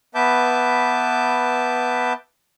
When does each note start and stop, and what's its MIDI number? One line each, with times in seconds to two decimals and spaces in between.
0.15 2.13 59
0.15 2.13 71
0.15 2.13 76
0.15 2.13 81
0.15 2.13 86
0.15 2.13 91